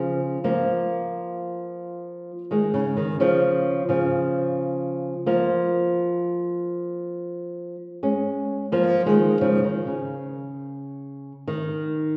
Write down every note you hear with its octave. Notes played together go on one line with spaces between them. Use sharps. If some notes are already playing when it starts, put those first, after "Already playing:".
Already playing: C#3 F3
F3 A#3
D#3 G#3
C#3
D#3
C#3 F3
C#3 F3
F3 A#3
G#3 C#4
F3 A#3
D#3 G#3
C#3 F3
D#3
C#3
D#3